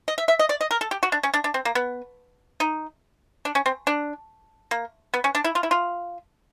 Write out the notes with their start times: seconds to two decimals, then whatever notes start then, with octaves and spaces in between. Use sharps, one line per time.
0.08 D#5
0.18 E5
0.28 E5
0.39 D#5
0.49 D5
0.61 D#5
0.71 A#4
0.81 A4
0.91 G4
1.03 F#4
1.12 D4
1.23 C#4
1.34 D4
1.44 D4
1.54 C4
1.65 A#3
1.75 B3
2.60 D#4
3.45 D4
3.55 C#4
3.66 C4
3.87 D4
4.71 A#3
5.14 B3
5.24 C#4
5.35 D4
5.44 E4
5.55 F4
5.63 E4
5.71 F4